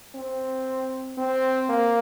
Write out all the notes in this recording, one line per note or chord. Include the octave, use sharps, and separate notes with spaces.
C4
C4
A#3